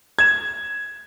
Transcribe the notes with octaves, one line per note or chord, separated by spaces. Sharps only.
G#6 E7